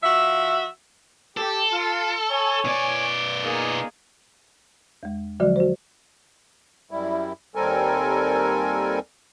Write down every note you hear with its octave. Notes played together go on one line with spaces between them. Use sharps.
F3 F#4 E5
G4 A4
F4
C#5 G#5
B2 D5
A#3 D#4 G#4
E2 G#3
D3 F3 F#3 G#3 F#4 D5
F#4 C5
F#2 G3 E4
D#2 G3 C4 A4 A#4 G#5